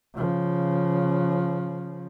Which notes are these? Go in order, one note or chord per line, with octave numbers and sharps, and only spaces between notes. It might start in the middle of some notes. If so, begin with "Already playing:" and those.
C#3 F3